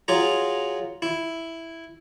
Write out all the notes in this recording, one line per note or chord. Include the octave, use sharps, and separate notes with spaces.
F#3 F4 G#4 A#5
E4